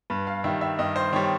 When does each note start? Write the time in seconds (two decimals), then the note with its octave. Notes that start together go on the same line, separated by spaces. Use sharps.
0.10 G2 B4
0.27 F5
0.44 D#3 G3 E5
0.61 E5
0.79 G2 D#5
0.96 C5
1.13 D#3 G3 C#5